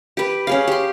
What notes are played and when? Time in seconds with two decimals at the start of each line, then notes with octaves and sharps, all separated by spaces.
0.17 G4 B4
0.47 C#4 G#4 F5
0.67 G4 C6